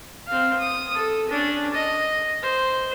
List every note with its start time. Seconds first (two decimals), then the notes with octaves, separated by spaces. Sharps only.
0.28 C4 F5
0.59 D#6
0.95 A4
1.29 C#4 D4
1.74 D#5
2.43 C5